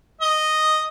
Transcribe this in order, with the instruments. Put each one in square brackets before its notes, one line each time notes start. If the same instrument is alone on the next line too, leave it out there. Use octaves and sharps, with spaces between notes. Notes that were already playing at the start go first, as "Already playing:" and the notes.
[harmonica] D#5